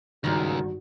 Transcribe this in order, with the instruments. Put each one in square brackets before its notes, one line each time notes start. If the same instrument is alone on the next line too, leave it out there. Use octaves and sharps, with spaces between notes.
[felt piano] G#1 G2 [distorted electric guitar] C#2 [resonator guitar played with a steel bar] A#2 D#3 [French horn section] F#4